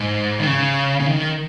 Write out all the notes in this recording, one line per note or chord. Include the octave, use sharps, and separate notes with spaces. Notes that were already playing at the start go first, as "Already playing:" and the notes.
Already playing: G#2
D#3
C#3
C#3
D#3